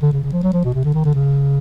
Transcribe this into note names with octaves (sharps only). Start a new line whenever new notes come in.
D3
C#3
C#3
F3
F#3
F3
B2
C3
D3
D#3
D3
C#3